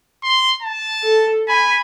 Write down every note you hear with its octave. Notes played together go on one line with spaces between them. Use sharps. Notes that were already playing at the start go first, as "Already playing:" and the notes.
C6
A5
A4
G#5 B5